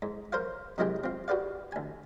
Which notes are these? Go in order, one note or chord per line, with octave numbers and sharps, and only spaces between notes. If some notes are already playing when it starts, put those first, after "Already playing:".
G#2
A#4 C5 C#5 F5
C3 D#3 F#3 G#3 E4 G4
C4 F4
F#4 G4 B4 D5 F5
D2 G#5